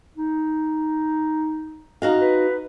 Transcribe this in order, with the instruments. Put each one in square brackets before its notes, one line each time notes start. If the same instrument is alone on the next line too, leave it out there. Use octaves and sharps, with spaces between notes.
[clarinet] D#4
[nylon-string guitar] D#4 F#4 F5
[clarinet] B4